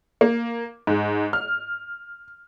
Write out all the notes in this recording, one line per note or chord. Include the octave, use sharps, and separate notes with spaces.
A#3
G#2
F6